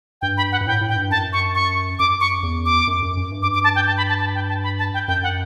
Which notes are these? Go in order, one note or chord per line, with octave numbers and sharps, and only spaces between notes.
G2 G5
B5
F#5
G2
A2 G5
A2
G5
G2
F#2 A5
C#6
C#6
F#2 D6
C#6
E2
D6
F#2
F#2
F#2
G2
D6
D6
A5
G5
A5
B5
A5
A5
G5
A5
B5
A5
G5
F#2 G5
F#5